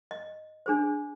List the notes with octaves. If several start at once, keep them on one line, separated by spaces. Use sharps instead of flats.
D#5
D4 G#4 C5